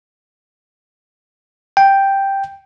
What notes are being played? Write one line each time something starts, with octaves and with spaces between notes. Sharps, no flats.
G5